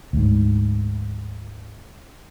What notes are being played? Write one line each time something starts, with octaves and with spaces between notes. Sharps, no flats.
D2 G#2